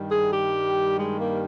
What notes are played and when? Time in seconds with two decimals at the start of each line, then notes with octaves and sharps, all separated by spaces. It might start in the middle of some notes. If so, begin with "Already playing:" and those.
Already playing: G2 D#3 G3
0.11 G#4
0.32 G4
0.97 G#3
1.18 A#3